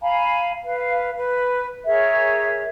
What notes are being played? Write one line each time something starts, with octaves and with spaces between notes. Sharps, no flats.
F5 G#5 A#5 B5
B4 F5
B4
G#4 A#4 C#5 E5